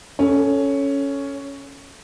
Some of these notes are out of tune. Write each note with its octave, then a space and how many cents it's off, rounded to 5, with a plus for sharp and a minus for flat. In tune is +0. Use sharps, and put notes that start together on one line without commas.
C#4 +5 A4 +0